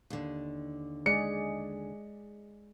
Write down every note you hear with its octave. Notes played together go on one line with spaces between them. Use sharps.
D#2 D3
G#3 G#4 D5 C#7